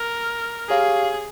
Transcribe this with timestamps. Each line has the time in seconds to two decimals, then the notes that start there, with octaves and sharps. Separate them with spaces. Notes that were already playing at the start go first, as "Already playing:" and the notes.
Already playing: A#4
0.69 G4 G#4 C#5 F5